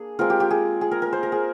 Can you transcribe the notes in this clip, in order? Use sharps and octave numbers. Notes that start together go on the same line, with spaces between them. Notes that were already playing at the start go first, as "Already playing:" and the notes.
Already playing: A#3 D4 G#4
G#3 C4 F4 A#4
G4
G4
G#4
G#4
A#4
A#4
C5
A#4
G#4